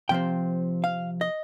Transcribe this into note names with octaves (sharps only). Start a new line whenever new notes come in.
C3 F3 C4 G5
F5
D#5